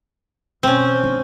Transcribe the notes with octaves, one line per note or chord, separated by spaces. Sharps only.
B2 C4 C#4
D4